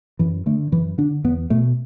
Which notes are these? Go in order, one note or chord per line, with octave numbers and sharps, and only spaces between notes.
F#2 E3
D3 A3
F#2 E3
D3 D4
E2 B3
B2 A3